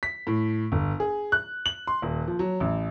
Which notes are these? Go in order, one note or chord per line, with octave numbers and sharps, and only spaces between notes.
B6
A2
G1
G#4
F#6
F#7
C6
D#1
F3
F#3
A1